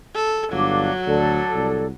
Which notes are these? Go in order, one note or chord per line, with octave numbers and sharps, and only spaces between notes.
A4
G1 F#3 D4 F5 D6
D2 A4 D5
C2